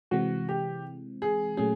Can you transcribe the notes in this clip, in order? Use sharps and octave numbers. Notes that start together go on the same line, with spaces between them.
C3 E3 G#3 C4 F#4
G4
G#4
A#2 F#3 A3 C#4 G#4